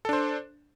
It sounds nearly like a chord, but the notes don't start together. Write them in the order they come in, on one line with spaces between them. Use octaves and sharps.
A4 D4 C5